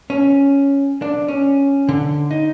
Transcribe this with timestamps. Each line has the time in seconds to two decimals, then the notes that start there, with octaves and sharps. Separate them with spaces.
0.10 C#4
1.02 D4
1.28 C#4
1.89 D3
2.31 D#4